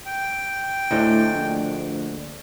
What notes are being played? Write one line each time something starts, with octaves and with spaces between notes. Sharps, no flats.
G5
D2 A2 A3 D4 D#4
A#1